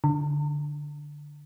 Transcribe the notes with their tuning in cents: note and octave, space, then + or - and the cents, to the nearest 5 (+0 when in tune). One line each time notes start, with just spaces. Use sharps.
D3 +0